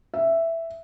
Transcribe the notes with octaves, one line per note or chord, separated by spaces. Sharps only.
E5